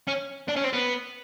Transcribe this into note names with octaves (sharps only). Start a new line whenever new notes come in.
C#4
D4
C#4
C4
B3